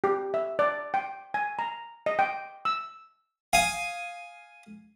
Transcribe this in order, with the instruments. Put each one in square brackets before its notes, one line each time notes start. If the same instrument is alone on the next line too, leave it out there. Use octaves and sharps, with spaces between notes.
[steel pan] G4
E5
D5
G5
G#5
A#5
D#5
G5
E6
[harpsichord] F5 G#5 D#6